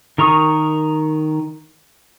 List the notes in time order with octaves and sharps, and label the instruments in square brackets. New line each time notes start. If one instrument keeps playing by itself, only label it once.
[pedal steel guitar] D#3 A#4 A#5 C#6 D#6